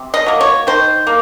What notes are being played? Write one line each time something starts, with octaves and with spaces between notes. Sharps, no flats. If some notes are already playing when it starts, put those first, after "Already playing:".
Already playing: C3
D#5
F#3 A#3
C#5
D#3 C5
A#3